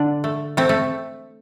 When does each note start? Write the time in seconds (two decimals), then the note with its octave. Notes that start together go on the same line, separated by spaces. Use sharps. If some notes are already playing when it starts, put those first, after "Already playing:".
Already playing: D3 D4
0.24 A3
0.57 A3 C4
0.69 A3